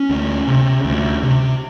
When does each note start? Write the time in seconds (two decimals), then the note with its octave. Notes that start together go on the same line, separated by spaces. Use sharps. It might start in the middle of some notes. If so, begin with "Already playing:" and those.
Already playing: C#4
0.10 D2
0.48 C3
0.85 D2
1.23 C3